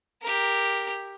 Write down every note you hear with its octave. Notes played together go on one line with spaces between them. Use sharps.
G4 A#4